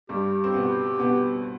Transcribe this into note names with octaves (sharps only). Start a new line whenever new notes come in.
G2 G3 G4
C4
B2 B3
B2 B3